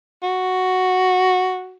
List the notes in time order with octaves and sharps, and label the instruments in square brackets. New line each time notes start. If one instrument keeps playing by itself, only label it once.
[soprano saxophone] F#4